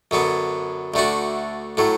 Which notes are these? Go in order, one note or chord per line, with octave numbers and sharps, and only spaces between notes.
F#2 D3 F#3 B3
D2 D3 A3 D4 F#4
A2 F#3 A3